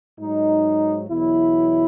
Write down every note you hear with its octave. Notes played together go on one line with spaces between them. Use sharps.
G#2 F#3 D#4
E2 B2 F#3 E4